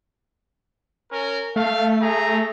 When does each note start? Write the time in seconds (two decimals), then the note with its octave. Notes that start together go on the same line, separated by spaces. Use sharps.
1.11 C#4 A#4
1.56 A3 F5
2.01 G#4 A#5